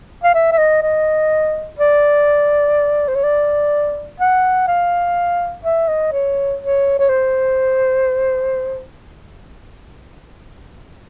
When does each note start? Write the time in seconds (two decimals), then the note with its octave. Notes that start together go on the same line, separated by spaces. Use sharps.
0.24 F5
0.34 E5
0.52 E5
0.58 D#5
0.82 D#5
1.79 D5
3.08 C5
3.15 C#5
3.23 D5
4.20 F#5
4.68 F5
5.65 E5
5.88 D#5
6.12 C#5
6.61 C#5
6.99 C#5
7.09 C5